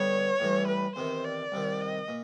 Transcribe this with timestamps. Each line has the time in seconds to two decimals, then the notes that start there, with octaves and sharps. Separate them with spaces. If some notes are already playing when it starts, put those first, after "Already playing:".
Already playing: D3 G3 B3 C#5
0.40 A2 E3 G3
0.68 B4
0.96 E2 C3 D#3 C5
1.24 D5
1.52 C2 C3 D#3
1.81 D#5
2.08 A#2